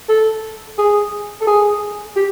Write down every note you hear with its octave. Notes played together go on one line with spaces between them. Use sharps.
A4
G#4
A4
G#4
G4